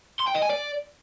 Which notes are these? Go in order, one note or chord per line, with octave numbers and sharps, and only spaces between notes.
C6
G5
D#5
G#5
D5